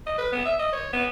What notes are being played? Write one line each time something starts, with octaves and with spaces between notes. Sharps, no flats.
D#5
B4
B3
E5
D#5
C#5
B3